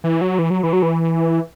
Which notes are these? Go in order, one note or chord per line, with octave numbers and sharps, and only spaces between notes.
E3
F#3
E3
F#3
E3
F#3
E3